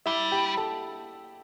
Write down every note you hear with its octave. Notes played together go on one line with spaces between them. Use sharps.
G3 E4 E5
G4 G5
A4 A5